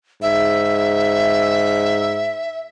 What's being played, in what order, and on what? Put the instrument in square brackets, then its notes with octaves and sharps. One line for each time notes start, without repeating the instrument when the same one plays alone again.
[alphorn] G#2 [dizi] E5